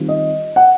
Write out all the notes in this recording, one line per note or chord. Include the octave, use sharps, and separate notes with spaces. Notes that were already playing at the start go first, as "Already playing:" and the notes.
Already playing: D#3 G3 C4 F4
D#5
F#5